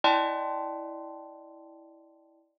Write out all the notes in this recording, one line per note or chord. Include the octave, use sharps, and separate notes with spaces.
E4 D5 D#5 G5 A5 C6